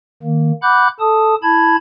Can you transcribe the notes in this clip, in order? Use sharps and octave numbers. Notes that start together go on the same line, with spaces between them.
D#3 A#3
F#5 B5 D6 F#6 G6
A4 A5 D#6
E4 A5 B5 G#6